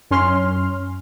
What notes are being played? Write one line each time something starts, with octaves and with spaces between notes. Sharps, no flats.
F#2 C#4 C6 F6